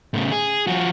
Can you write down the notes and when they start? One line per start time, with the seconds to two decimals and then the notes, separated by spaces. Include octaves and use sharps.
0.14 A2 C#3
0.32 G#4
0.67 F3 F#4